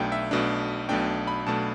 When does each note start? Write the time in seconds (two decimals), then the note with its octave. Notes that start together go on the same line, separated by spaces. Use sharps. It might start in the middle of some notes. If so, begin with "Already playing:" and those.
Already playing: B1 B2 A3 D4 G5
0.12 E5
0.31 B1 B2 A3 D4
0.89 B1 B2 A3 D4 G5
1.27 B5
1.46 B1 B2 A3 D4 A5